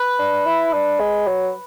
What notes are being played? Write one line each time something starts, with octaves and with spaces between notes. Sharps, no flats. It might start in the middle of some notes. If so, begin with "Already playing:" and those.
Already playing: B4
D4
E4
D4
G#3
F#3